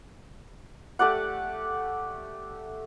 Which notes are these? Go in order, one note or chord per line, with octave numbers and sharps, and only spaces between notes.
A3 G4 D5 F#5